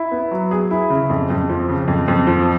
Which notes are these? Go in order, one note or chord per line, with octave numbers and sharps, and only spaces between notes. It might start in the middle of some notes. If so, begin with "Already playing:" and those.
Already playing: E4
B3
F#3
G#4
E4
C#3
F2
F2
F3
C#3
F2
F2
F3